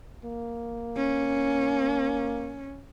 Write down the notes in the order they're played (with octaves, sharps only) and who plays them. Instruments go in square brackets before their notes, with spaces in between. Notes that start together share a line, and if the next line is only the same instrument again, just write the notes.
[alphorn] A#3
[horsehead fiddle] C#4